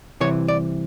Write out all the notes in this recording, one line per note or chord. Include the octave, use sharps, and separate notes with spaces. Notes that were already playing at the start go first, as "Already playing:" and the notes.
C2 C3 E3 C#5
D5